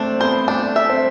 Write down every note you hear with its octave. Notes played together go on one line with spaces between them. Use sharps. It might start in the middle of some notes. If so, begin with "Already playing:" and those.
Already playing: A3 C4 D4
B3 C5
A3 D4
E5
C4